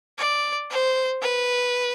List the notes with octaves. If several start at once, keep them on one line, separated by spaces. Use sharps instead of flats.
D5
C5
B4